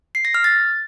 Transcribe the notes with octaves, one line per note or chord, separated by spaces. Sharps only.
C7
A#6
F6
A6